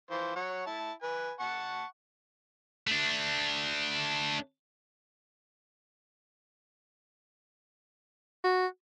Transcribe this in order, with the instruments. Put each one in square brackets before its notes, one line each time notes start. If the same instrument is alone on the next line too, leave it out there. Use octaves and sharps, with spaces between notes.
[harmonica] E3 F4 C5
F#3 C#5 F#5
E4 A5
B4 G#5
F#5 A5 C#6
[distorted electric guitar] A3 D4
[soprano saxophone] F#4